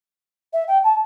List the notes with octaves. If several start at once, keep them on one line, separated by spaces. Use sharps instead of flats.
E5
G5
A5